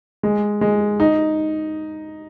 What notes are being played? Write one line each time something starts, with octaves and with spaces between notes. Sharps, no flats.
G#3
G#3
D#4